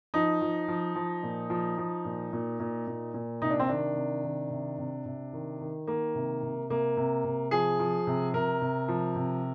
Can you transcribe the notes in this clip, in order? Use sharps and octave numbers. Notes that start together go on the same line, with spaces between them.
F3 D#4
F3
F3
F3
A#2
F3
F3
A#2
A#2
A#2
A#2
A#2
C3 D#4
D4
C4
D#3 D4
C3
D#3
C3
C3
C3
D#3
D#3
D#3 A#3
C3
C3
C3 A#3
C3
C3
F3 G#4
F3
C3
C3 A#4
C3
F3
C3